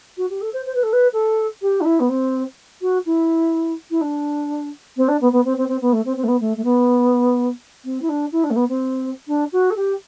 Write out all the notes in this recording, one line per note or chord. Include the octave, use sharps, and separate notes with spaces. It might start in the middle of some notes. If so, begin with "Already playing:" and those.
F#4
G4
A4
C5
C5
B4
A4
B4
A4
G4
D4
E4
B3
C4
F#4
E4
E4
D4
C4
D4
B3
B3
C4
C4
C4
B3
A3
C4
C4
A3
B3
A3
A3
B3
C4
E4
D4
E4
D4
A3
B3
C4
D4
F#4
A4
G4